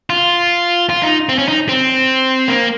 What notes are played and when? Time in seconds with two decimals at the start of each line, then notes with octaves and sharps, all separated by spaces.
0.10 F4
0.90 F4
1.03 D#4
1.29 C4
1.38 C#4
1.48 D#4
1.69 C4
2.48 A#3